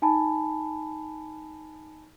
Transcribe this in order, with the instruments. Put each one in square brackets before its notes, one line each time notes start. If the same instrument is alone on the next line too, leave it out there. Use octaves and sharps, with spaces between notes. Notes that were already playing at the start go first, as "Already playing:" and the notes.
[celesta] D#4 G#5 A5 B5